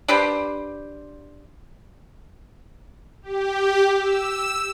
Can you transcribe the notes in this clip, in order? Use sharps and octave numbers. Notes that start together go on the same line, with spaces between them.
D4 G4 B4 C5
G4
E6